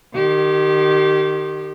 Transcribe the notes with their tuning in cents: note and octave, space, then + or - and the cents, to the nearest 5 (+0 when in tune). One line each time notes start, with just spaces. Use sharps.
D#3 -35 G4 -20